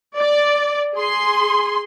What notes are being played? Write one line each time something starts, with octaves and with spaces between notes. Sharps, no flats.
D5
G#4 C6